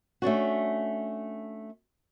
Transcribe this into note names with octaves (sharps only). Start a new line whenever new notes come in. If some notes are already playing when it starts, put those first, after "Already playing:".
A3 C#4 D4 F#4